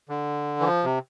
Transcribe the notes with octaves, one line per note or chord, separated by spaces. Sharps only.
D3
E3
F3
C3